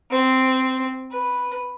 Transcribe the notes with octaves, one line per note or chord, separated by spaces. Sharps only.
C4
B4